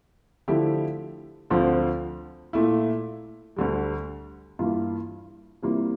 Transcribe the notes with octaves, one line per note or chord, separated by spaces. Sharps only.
D3 F3 A3 E4 G4
D2 D3 F3 C4 F4
A#2 A3 E4
D2 D3 G3
G2 E3 A#3 F4
C3 E3 G3 A#3 F4